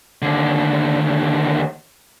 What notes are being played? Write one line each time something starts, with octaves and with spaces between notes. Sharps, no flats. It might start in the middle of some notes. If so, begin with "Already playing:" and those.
D#2 D3